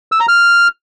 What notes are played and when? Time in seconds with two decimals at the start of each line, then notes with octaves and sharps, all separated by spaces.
0.12 E6
0.20 A#5
0.28 F6